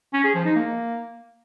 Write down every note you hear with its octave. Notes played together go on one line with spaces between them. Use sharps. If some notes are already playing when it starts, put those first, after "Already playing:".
C#4
G#4
F3
D#4
A#3